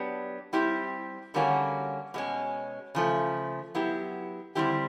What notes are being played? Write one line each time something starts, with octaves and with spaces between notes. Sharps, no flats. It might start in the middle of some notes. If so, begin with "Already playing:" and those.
Already playing: F#3 B3 D4 G4
G3 C4 E4 G4
D3 G3 A#3 C#4 F#4
B2 G#3 C#4
C#3 F3 A3
F#3 B3 E4 G4
D3 G3 C4 E4 G4